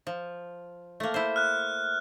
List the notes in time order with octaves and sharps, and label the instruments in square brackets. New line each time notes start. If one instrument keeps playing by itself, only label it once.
[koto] F3
A3 A#3
E4 C5
[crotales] F6 F#6